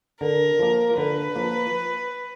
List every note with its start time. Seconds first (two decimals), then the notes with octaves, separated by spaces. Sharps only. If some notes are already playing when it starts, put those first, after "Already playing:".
0.21 D3 A#4
0.59 F3 A#3
0.97 D3 B4
1.36 F3 A#3